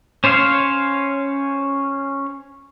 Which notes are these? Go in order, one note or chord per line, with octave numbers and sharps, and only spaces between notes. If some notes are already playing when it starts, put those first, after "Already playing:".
C#4 C5 C#5 F5